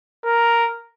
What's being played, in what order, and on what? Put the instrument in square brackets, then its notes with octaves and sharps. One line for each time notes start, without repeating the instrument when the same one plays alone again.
[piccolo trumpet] A#4